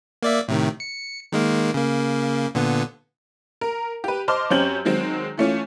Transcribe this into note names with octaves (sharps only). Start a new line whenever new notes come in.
A#3 D5 E5
A2 C3 D#3
C#7
D#3 G#3 A#3
C#3 A#3
A#2 D3 B3
A#4
G4 B4
C5 D#5 A5 C6 D6 F6
F#2 C4 C#4 G4 G6 F#7
D#3 F#3 G#3 C4
E3 A3 C#4 F4